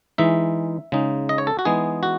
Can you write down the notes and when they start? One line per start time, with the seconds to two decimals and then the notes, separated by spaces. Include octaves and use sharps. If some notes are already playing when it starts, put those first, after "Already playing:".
0.18 E3 G#3 D#4 E5
0.92 C#3 G#3 D#4
1.29 D#5
1.38 C#5
1.47 A4
1.59 F#4
1.65 E3 G#3 B3 D#4 G#4
2.03 F#4